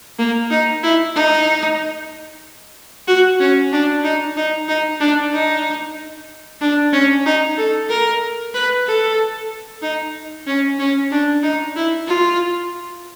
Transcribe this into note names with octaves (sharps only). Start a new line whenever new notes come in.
A#3
D#4
E4
D#4
F#4
C#4
D4
D#4
D#4
D#4
D4
D#4
D4
C#4
D#4
A4
A#4
B4
A4
D#4
C#4
C#4
D4
D#4
E4
F4